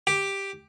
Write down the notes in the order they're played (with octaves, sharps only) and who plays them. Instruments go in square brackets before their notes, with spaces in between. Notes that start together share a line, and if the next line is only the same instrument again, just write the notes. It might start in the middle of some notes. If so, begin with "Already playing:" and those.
[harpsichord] G4